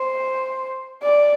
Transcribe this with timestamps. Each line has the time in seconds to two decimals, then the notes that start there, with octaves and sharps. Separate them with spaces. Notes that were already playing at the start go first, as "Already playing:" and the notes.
Already playing: C5
1.03 D5